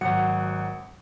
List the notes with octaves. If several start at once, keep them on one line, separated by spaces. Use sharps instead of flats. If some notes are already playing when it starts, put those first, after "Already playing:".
G#1 F#3 F#5 C#7